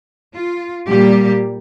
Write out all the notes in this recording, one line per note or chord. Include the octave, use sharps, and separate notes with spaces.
F4
A#2 G3 A#3 G4